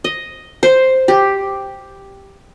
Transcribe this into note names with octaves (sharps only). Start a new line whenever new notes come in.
D#5
C5
G4